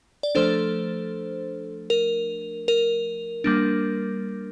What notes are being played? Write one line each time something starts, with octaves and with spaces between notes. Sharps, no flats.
D5
F3 A3 D4 A4 C5
A#4
A#4
G3 A#3 D4